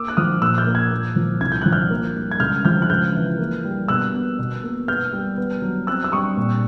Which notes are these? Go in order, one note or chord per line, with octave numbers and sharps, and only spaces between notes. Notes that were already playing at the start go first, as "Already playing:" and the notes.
Already playing: A#3 D6 E6
F#6
F3 D#6 F6
A#2 E6 F#6
F6 G6
A#3
F#6 G#6
A#3
F3
C2 G#6
G6
F3 F#6
F6 G6
A#3
G3
G#6
C#2 F6 G6
F3 F6 G6
F#6
C#2 F6 G6
E3
A#3
G3
B2 E6 F#6
B3
B2
A#3
B3 F6 G6
G3
B3
F#3
C4 E6 F#6
E6
G3 C#6 D#6
A#2